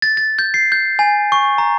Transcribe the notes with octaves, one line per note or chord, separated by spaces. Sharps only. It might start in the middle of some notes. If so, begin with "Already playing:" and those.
A6
A6
G6
C7
G6
G#5
C#6
A#5